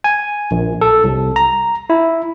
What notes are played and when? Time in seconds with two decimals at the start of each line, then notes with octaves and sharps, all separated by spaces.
0.04 G#5
0.51 A#1
0.81 A4
1.04 C2
1.36 A#5
1.90 E4